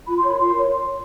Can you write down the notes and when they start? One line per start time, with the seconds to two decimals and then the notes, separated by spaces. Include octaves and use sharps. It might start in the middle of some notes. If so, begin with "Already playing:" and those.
0.08 F4 B5
0.18 C6
0.24 A#4 C#5 B5
0.38 F4 C6
0.53 A#4 C#5